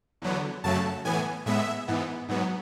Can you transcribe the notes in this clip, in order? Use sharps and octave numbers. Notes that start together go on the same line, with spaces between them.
E2 D3 F#3 B3
F#2 C#3 F#3 A3 A5
A2 E3 B3 G#5
A2 G#3 B3 E5
G#2 E3 B3
G#2 F#3 B3